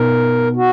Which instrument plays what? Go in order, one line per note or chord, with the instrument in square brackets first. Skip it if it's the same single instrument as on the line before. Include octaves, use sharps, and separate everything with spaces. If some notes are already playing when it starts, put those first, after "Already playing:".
Already playing: [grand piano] B2 B3 D#4 [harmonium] A#4
[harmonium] F#4